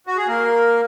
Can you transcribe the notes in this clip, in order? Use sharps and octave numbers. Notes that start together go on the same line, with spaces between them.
F#4
G#4
A#3 A#4